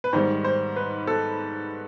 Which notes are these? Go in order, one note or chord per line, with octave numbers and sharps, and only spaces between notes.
B4
G#2 D#3 G3 C5
C5
B4
A4